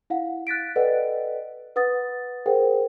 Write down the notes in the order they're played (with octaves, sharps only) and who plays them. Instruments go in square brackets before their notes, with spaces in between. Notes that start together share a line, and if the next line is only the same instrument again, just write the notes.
[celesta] E4 F5 F#5
F#6 A6 B6 D7
A4 B4 D5 D#5 F#5 G5
B4 F#5 D#6 A6
G#4 A#4 C5 F#5 G5